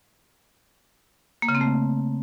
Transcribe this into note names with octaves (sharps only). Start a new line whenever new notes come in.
A#3
C#3
C4
A3